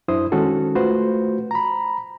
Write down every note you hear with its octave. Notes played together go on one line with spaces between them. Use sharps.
F#2 D4 E4 C5 D#6
D#3 G#3 C#4 F#4 A4
A3 F4 F#4 B4 C5
A#5 B5